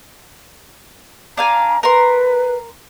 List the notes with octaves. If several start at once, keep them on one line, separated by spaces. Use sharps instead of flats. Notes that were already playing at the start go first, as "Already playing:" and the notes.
D4 F5 G#5 A#5
A#4 B4 C6